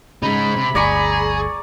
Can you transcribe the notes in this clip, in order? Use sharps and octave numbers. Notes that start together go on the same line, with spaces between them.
C#3 G#3 D#4 B5
C3
G1 D2 G#4 D5 A#5 C#6